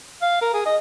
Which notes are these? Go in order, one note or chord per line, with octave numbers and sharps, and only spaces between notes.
F5
A#4
G#4
D#5